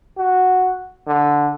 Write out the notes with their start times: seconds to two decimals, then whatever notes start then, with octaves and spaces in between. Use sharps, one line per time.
0.18 F#4
1.07 D3